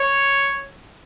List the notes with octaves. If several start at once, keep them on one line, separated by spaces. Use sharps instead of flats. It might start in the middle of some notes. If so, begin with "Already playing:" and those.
Already playing: C#5